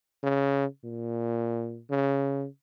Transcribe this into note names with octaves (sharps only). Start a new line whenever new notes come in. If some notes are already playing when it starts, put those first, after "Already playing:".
C#3
A#2
C#3